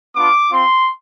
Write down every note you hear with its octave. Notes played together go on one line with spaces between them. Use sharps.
B3 D4 F4 D6
C4 F4 C6